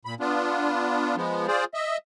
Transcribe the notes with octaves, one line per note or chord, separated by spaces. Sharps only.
A#2 B5
B3 D4 F4
F3 G#3 B3
F4 G#4 C5 D5
D#5 E5